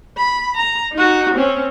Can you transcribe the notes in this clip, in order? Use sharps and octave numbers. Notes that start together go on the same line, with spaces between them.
B5
A#5
D#4 F#4
C4 C#4